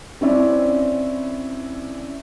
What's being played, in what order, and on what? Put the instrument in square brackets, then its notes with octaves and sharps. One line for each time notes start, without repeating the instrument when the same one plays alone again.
[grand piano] C4 C#4 E4 D5